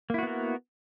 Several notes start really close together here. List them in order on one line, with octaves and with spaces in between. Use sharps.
A#3 E4 F#4 B3 A#4